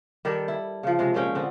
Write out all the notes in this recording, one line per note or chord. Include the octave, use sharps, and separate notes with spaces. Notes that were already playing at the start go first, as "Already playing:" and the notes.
D#3 G3 G4 A4
E4
C#3 F3
C3 G#3
A#2 G#3 C#4 G5
D3 B3 C4